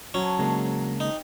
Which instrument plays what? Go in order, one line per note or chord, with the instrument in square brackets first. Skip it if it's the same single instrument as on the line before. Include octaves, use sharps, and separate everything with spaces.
[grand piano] F#3 [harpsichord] C#4 [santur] C5 A5
[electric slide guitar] C#3 G#3 A#3 [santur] D4 G#4 C#5
[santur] G3 C4 [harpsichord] D#4